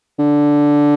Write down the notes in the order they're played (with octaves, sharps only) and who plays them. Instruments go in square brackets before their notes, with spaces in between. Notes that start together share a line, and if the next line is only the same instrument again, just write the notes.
[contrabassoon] D3